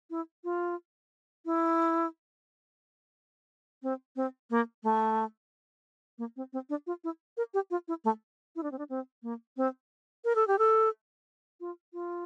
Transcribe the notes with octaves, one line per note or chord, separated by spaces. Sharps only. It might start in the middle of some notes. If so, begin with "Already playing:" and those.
E4
F4
E4
C4
C4
A#3
A3
A#3
C4
C4
D4
F4
E4
A#4
G4
F4
E4
A3
E4
D4
C4
D4
C4
A#3
C4
A#4
A4
G4
A4
F4
F4